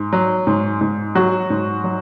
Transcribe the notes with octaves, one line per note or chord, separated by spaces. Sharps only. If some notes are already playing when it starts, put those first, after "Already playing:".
Already playing: G#2
F#3
G#2
G#2
F#3 F#4
G#2
F#3